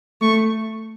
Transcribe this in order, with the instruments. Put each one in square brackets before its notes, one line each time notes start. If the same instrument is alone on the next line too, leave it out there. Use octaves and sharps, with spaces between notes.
[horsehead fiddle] A3 [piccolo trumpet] C#6